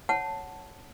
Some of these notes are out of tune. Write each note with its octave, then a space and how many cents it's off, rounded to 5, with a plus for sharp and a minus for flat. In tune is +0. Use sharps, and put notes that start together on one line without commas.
C#5 +0 F#5 +0 A5 +0